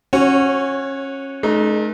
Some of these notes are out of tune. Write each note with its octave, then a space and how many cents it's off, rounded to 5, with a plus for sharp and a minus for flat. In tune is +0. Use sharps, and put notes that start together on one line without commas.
C#4 -25 F#4 -15 C#5 +0
A3 -45 D#4 -30 A#4 +30